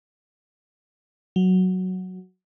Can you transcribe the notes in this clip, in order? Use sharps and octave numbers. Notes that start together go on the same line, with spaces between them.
F#3